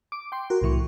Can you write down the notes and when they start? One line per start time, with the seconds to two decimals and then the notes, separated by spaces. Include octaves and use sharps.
0.12 D6
0.32 G5 C6
0.50 F#4 A#4
0.62 C2 A2 E3 C#6